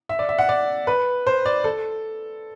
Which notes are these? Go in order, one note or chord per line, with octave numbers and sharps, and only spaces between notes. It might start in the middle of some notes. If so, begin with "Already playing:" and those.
E5
D5
E5
F#5
D5
B4
C5
D5
A4